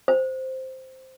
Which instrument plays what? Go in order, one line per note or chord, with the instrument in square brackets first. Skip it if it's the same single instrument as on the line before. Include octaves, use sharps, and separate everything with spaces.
[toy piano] C5